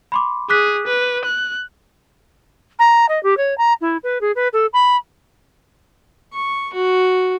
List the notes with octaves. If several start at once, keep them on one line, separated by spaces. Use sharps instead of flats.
B5 C6 D6
G#4 D6 F#6 B6
B4
F#6
A#5
D#5
G4
C#5
A#5
E4
B4
G#4
B4
A4
B5
C#6
F#4